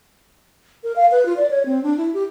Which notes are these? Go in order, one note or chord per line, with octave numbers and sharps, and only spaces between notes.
A#4
F5
B4
F4
D5
C#5
C4
D4
E4
G4